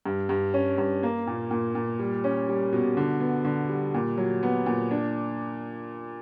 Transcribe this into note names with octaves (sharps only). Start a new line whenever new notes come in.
G2
G2
C#4
G2
A#3
A#2
A#2
A#2
G3
C#4
G3
B2
D3
B3
D3
G3
A#2
F#3
B3
A#2
D4